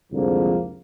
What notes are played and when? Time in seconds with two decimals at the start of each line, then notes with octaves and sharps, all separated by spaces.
0.13 C2 F2 D3 F3 G#3 A#3